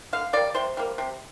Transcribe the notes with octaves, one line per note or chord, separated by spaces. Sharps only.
D3 F5
G3 A#3 D5
C3 C5
G3 A#3
C3